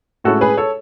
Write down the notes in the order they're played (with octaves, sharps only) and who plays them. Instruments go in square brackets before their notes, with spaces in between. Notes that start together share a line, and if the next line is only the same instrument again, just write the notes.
[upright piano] A2 G#3 C#4 E4 F#4 A4
G#4 B4
A4 C#5